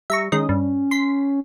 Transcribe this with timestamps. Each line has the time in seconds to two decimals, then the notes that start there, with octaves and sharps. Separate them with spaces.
0.10 G3 E5 A#5 C#6
0.32 D#3 G#3 C#4 D#5
0.49 G2
0.91 C6 B6